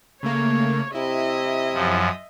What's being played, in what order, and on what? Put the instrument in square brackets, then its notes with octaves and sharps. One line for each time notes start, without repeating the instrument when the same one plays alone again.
[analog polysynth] C#3 A3 A#3 [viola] C#5
[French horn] C3 [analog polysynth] E4 [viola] D#5 E5
[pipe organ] F#2 F3